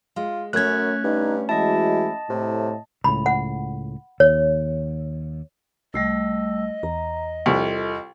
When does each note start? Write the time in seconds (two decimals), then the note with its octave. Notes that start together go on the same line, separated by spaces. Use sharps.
0.16 G#3 F4
0.53 F#2 A3 C#4 F#6 G#6
1.04 G2 D#4
1.49 E3 G#3 E4 F#4 D#5 A5
2.30 A2 C3
3.04 C#2 A2 B5
3.26 F#5
4.20 D#2 C#5
5.94 C2 G3 A3 D#5 E6
6.83 E2 A#5
7.46 C2 F4 A4